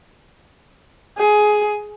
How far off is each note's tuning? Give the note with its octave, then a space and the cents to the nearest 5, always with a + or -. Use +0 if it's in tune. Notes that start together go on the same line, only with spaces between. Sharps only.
G#4 +15